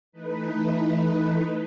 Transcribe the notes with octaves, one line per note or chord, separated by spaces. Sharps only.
E3 A3 D#4 B4